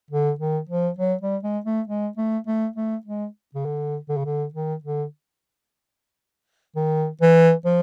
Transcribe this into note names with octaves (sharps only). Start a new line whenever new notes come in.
D3
D#3
F3
F#3
G3
G#3
A3
G#3
A3
A3
A3
G#3
C#3
D3
D3
C#3
D3
D#3
D3
D#3
E3
F3